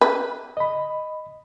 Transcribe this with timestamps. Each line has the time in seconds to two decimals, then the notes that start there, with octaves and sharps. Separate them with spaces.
0.01 B4
0.57 D#5 B5